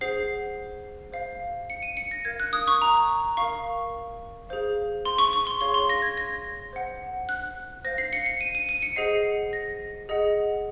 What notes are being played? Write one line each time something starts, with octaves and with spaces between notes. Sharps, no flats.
G#4 C5 F#5 C7
C5 F5
C#7
D#7
C#7
A#6
A#4 F5 G#6
F#6
D#6
C#6
A#5
A#4 F5 C#6
G#4 C5 F5
C6
C#6
C#6
C6
G#4 C#5 F5 C6
C6
A#6
G#6
A#6
C5 F#5
F#6
C5 F5 A#6
C7
C#7
C#7
D#7
D#7
D#7
C#7
G#4 C5 D#5 F#5 C7
A#6
G#4 D#5 F#5